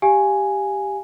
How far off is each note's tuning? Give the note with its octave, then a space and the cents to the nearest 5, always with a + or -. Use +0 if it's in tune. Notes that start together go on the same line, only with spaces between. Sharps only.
G4 +0 F5 +0 G#5 +0